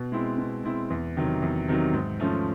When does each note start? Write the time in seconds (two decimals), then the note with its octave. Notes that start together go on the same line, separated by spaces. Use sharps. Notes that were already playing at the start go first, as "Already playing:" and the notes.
Already playing: B2
0.12 G#3 C4 E4
0.38 B2
0.64 G#3 C4 E4
0.90 E2
1.16 C3 D#3 F#3
1.42 E2
1.68 C3 D#3 F#3
1.93 G#2
2.20 F3 A3 C#4